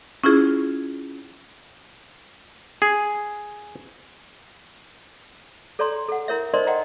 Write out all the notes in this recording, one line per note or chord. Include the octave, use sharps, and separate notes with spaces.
C#4 E4 F4 G#4
G#4
A4 C#5 D5 A#5 C6
A4 F#5
E4 A#4 C#5 E5
D#4 A#4 C5 D5 D#5 C6
D5 D#5 F#5 G5 A#5